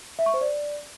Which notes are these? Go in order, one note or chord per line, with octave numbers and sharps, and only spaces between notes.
E5
C#6
C5
D5